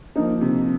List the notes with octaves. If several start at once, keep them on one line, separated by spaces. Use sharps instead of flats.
F3 A#3 D#4
C3